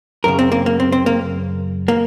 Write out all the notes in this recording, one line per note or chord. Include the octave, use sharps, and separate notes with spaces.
F#2 C#3 A#4
C4
A#3
A#3
C4
C4
A#3
A#3